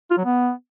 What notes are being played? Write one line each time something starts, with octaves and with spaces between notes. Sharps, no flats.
F4
F#3
B3